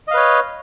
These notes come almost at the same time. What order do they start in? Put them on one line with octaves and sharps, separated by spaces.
D#5 F5 B4 C#5